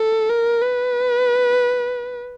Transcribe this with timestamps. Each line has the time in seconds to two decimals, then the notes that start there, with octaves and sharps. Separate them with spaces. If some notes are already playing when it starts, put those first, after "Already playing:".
Already playing: A4
0.30 A#4
0.62 B4